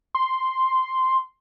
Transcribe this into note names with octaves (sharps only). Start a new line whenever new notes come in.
C6